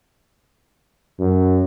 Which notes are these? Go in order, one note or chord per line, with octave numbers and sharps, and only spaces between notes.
F#2